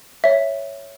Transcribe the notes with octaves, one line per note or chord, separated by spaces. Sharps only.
C#5 E5